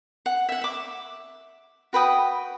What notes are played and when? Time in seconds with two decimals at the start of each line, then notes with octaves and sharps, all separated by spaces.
0.26 F#5
0.49 E5 F#5
0.61 E5 D6
1.93 F#4 B4 G5 D#6